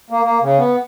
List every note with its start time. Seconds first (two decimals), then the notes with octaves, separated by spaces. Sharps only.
0.10 A#3
0.24 A#3
0.42 C#3
0.58 B3